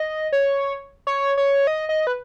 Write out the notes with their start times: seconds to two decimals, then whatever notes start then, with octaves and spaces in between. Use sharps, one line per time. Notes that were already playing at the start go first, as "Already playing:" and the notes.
Already playing: D#5
0.33 C#5
1.07 C#5
1.38 C#5
1.67 D#5
1.89 D#5
2.07 B4